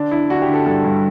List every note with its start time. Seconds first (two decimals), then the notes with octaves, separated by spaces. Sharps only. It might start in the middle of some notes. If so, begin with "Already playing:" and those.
Already playing: D3 D4
0.11 D3 E4
0.30 D3 F#4
0.42 G4
0.48 D3
0.53 A4
0.66 G2 A4
0.84 G2